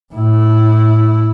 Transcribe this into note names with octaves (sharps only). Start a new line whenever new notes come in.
A2 E4